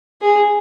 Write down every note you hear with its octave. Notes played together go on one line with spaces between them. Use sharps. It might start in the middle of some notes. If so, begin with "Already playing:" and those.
G#4